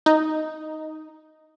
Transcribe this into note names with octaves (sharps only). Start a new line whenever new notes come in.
D#4